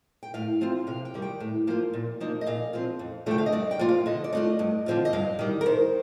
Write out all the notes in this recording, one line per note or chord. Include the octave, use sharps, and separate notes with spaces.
G5
A2 F5
F3 C4 F4
C3 F5
G5
D#3 G3
G5
A2
F3 A#3 F4
A#2
F3 A#3 D#4
D#5
A#2 F5
F3 C4 F4
F2
D3 F3 A3 D4 G5
F5
D#5
G2 D5
G5
F3 A#3 F4
F5
D3 D#5
D5
A3 D4 F4 D#5
G2
D3 F3 C4 F4
D#5
G2 F5
D#3 G3
A#4
D#3 C5